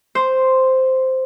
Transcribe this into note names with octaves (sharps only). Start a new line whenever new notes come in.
C5